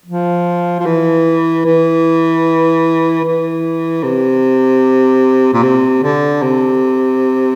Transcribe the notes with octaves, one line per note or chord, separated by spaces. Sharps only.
F3
F3
E3
E3
E3
C3
A#2
C3
D3
C3